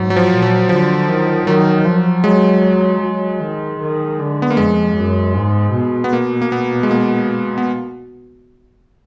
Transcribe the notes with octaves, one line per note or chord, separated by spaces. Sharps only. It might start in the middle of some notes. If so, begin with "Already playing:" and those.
Already playing: G#2 F#3
F#3
F3
A#2
F#3
D3 F3
D#3
D#3 F#3
F3
F#3 G#3
F#3
D#3
D#3
D3
B3
A#3
F2 G#3
F#2
G#2
B2
B3
A#3
A#3
B3
G#3
A#3
B3